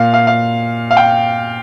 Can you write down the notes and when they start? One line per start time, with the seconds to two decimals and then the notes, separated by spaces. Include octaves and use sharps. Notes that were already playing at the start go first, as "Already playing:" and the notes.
Already playing: A#2 F5
0.13 F5
0.27 F5
0.91 F5
0.97 G5